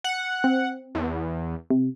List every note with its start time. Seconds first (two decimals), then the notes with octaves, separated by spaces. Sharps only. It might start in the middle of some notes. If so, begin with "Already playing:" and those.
0.04 F#5
0.44 C4
0.95 E2
1.70 C3